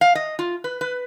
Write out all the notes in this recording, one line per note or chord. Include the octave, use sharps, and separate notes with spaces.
F5
D#5
F4
B4
B4